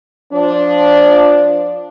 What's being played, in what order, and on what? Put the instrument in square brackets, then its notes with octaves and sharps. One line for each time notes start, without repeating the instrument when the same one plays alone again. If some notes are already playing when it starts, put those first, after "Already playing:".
[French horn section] F3 D4